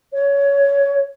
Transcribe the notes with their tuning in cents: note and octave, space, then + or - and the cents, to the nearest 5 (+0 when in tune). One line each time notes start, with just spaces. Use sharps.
C#5 +15